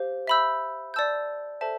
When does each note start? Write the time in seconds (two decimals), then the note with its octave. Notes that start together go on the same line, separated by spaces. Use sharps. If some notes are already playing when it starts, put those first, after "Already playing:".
Already playing: G4 C5 F5
0.27 E5 B5 E6 G6
0.94 D5 A5 E6 G6
1.61 A4 C5 E5 A5